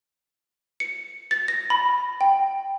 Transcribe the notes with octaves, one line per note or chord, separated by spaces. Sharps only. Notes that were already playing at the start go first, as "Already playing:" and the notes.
C#7
A6
A#6
B5
G5